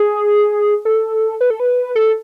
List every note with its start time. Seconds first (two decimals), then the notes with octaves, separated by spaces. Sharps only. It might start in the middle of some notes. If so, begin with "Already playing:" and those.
Already playing: G#4
0.85 A4
1.41 B4
1.50 A4
1.60 B4
1.95 A4